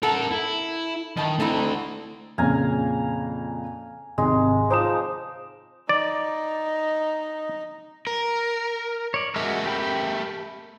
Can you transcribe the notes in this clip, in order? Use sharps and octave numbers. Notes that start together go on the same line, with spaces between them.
A4 A#4 F#5
E4
G2 D#3 A5
D3 A3 C4 D#4 E4
F2 A#2 C#3 F5 G#5 A#5
G#1 C3 G#3
F3 D#4 C5 D6 E7
D#4 D5
A#4
C#5 D5
G#3 A3 F#4 A#4 E5
G4 G5 B5